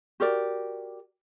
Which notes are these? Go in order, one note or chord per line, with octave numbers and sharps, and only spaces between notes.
F#4 G4 A#4 D5